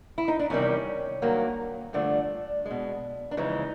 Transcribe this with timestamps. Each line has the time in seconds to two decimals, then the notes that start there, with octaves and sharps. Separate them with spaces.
0.18 E4
0.28 D#4
0.39 D4
0.50 E2 C3 D#3 G3 C#4
1.22 G2 D#3 F#3 A#3
1.93 G2 D3 F3 A3 D4
2.66 G#3
2.71 B2
3.31 D4
3.37 F2 C#3 E3 G#3 D#4